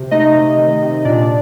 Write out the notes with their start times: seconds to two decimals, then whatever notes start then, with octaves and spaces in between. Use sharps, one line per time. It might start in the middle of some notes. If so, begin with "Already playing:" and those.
Already playing: C3
0.11 A3 D#4 D#5
0.35 C3
0.58 D#3
0.81 C3
1.05 A#2 D4 D5